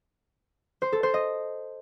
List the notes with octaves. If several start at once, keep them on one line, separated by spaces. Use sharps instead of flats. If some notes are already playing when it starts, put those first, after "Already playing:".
C5
A4
C5
D#5